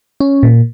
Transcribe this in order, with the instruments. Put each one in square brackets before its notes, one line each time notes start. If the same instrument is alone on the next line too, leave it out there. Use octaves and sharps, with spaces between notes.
[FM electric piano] C#4
A#2